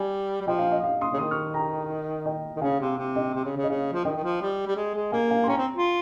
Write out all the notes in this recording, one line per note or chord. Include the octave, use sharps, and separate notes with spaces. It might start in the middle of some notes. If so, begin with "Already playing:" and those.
Already playing: G3 G#5
G3
F3 D#5 G5
F5
D#5
F5
C6 D#6
C#3
D#3 C6 D#6
C#6 F6
G5 A#5
D#5 G5
D#3
C#3 F5 G#5
C3 F5
C3
D#5 G5
C3
C#3
C#3
D#5
C#3 F5
F3
D#3 D#5 G5
D#3
F3
G3
G3
G#3
G#3
A#3 F5 G#5
F5 G#5
C6
C#4 G5 A#5
C4
F4